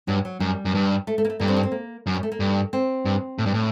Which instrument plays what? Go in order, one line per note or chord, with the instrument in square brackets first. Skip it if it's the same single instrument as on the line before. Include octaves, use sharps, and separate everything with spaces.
[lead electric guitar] G2 [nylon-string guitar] F#3
[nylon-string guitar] F#3
[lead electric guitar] F#2 [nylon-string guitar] G3
[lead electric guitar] F#2
G2
[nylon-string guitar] A3
A3
A#3
A3
[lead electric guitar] G2 [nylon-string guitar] A#3
[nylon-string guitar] C4
A#3
C4
A#3
[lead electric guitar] F#2
[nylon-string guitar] G3
A3
A#3
[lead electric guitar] G2
[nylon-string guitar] C4
[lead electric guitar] G2
A2
G2
A2